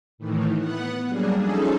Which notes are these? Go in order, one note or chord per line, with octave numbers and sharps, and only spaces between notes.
A2 D#3 E3
B3 F#5
F#3 G3 A#3 D4 G#4
F3 C#4 D#4 G#4 A4